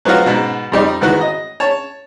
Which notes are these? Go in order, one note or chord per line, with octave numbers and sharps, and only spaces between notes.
F#3 B3 C4 F4 F#4
G#2 B2
F2 G3 D#4
G#2 D#3 E3 B3 F#4
D#5
C#5 A5